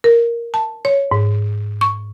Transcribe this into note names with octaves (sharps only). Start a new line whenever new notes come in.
A#4
A5
C#5
G#2
C#6